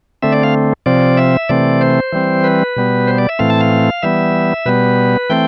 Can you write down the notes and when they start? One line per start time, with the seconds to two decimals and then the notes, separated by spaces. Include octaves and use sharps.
0.22 D3 A3 C4 E5
0.32 D5
0.43 F5
0.86 C3 F3 C4 D5
1.17 E5
1.49 C3 E3 A3 C4 D5
1.81 C5
2.12 E3 G3 C4
2.44 B4
2.76 B2 G3 B3
3.07 C5
3.18 D5
3.29 E5
3.39 A2 E3 A3 C4 F5
3.50 A5
3.61 F5
4.02 E3 G3 B3 E5
4.66 B2 G3 B3 B4
5.30 E3 A3 C4 G5